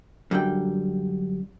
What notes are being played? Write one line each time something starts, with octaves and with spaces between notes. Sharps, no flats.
F#2 D3 G3 G5